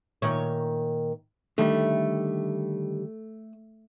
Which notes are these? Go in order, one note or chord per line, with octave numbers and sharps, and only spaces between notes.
A#2 D#3 C#5
D3 D#3 G3 A3